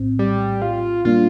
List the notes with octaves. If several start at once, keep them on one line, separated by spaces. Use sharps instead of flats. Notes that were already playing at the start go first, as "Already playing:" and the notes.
Already playing: A#1 A2 C4
G3
F4
A#2 G3 A#3 D4 F4